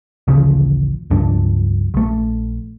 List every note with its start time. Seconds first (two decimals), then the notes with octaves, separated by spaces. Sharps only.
0.28 A1 D2 C#3 F3
1.10 C#2 G2 F3 D4
1.94 A#1 A3